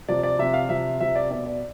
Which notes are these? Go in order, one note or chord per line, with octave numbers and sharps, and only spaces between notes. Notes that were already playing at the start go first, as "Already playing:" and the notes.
C3 F3 D5
D5
C3 F3 E5
F5
C3 F3 E5
C3 F3 E5
D5
B2 D5
D5